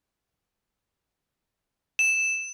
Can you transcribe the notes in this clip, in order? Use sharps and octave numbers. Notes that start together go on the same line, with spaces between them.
E7